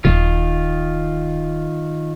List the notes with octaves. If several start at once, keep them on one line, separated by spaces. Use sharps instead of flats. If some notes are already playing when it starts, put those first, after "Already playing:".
D#1 D#3 F4